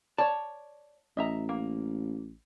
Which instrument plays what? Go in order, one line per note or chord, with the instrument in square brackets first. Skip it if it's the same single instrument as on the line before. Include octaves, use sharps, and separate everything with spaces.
[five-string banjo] C#5 D5 [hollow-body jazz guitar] A5
[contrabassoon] A1 [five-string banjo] D#5 E5 A#5
[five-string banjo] A#3